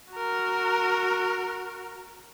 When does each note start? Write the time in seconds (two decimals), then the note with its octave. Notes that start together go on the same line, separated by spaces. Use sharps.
0.13 F#4 A#4